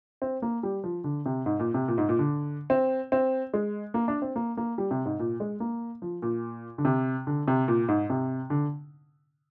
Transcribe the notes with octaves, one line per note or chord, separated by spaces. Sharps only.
C4
A#3
G3
F3
D3
C3
G#2
A#2
C3
A#2
G#2
A#2
D3
C4
C4
G#3
A#3
D4
C4
A#3
A#3
G3
C3
G#2
A#2
G#3
A#3
F3
A#2
D3
C3
D3
C3
A#2
G#2
C3
D3